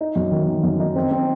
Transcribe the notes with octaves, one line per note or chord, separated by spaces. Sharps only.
D#4
F#2
D#3
D#3
F#2
D#4
C4
C4